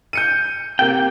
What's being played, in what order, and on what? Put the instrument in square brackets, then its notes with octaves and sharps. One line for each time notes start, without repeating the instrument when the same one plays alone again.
[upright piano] G6 C#7 D#7
[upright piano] C3 A#3 [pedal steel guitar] G5